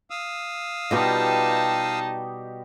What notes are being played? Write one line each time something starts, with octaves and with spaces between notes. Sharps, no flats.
F5 D#6 E6
B2 G3 B3 D#4 F4 G4 D#5 A5